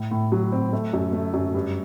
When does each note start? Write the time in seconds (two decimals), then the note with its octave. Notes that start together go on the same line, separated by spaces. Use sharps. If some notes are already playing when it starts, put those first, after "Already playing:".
Already playing: A2
0.11 A2
0.32 F#3
0.52 C4
0.73 A3
0.93 F#2
1.13 A3
1.34 F#2
1.54 G2